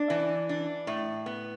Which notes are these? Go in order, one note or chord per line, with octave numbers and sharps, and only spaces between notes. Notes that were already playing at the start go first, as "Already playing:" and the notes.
Already playing: D4
E3
D4
A2
B3